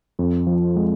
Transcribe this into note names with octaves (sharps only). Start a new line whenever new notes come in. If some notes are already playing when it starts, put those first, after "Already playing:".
F2
F3
G#3